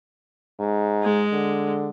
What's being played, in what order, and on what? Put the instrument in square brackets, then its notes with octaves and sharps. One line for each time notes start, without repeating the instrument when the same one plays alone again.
[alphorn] G#2
[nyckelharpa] G#3
[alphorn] D3